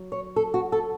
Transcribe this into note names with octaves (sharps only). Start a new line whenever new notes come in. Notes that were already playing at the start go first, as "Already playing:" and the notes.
Already playing: F#3
C#5
A4
F#4
A4